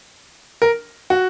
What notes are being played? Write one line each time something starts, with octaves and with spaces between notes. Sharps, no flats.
A#4
F#4